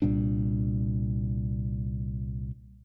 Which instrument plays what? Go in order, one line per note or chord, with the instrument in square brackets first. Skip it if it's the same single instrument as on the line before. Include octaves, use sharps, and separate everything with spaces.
[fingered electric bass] C2 A#2 G3 D4